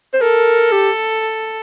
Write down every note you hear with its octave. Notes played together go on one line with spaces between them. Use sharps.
C5
A4 A#4
G4